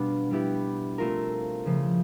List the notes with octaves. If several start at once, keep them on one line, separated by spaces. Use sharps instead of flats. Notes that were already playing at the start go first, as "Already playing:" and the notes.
Already playing: B2 G3 B3 D4 F4
G3 B3 E4 G4
A3 C4 F4 A#4
C#3 F3 A3